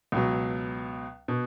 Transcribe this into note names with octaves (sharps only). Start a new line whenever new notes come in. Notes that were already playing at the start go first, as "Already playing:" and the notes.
C#2 B2 F#3
B2